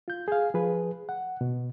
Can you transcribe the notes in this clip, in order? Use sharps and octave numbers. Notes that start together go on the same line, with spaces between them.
F4 G6
G#4 F5
F3 G#4 B4
F#5
B2